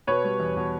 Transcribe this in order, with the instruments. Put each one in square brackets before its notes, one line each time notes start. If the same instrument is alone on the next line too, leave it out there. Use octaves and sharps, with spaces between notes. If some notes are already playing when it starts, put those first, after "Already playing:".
[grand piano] B2 [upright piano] B4 C#5
[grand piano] G3
E2
B2